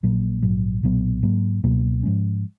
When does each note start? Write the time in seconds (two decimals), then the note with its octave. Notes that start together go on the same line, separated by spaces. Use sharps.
0.03 A#1 A#2 F#3 A#3
0.43 A#1 G#2 F#3
0.83 B1 A#2 F#3 B3
1.23 G#2 F#3 A#3
1.63 C#2 B2 F#3 A#3
2.03 G#2 F3 G#3 C#4